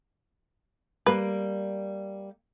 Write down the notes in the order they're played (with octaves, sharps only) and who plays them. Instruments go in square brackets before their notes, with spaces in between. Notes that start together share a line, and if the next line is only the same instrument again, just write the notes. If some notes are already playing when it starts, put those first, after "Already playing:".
[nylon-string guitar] G3 A#3 [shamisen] B4